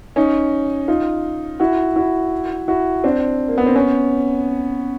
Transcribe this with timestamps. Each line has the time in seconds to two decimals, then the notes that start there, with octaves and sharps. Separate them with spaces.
0.16 C#4 D#4
0.88 D#4 F4
1.60 E4 F#4
1.96 E4 F#4
2.68 E4 F#4
3.04 C4 D4
3.48 A#3
3.58 B3
3.67 C4
3.76 B3 C#4